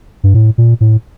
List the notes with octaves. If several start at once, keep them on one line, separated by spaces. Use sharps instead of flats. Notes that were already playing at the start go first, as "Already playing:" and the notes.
G2
A2
A#2
A2